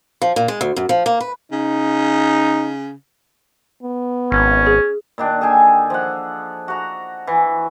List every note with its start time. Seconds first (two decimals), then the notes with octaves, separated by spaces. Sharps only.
0.22 F3
0.36 A#2
0.48 G#3
0.61 D2
0.76 F#2
0.89 F3
1.06 A#3
1.21 B4
1.52 C#3 D#4
3.83 B3
4.32 G#1 C#4
4.67 G#4
5.18 A#2 D#3 D4
5.41 G#4 A4 G5 G#5
5.90 F3 F#5
6.68 F#4 A#5
7.27 E3